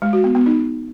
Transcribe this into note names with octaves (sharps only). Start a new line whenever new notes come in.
G#3
F#4
B3
B3
D#4